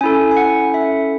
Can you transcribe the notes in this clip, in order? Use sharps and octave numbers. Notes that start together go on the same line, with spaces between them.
C#4 E4 A4 G#5
G#5
F#5
E5